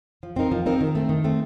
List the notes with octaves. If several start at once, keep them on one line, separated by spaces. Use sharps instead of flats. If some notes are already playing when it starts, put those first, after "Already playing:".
F3
C4 D#4 A#4
F3
C4 D#4 A#4
D#3
A3 C4
D#3
A3 C4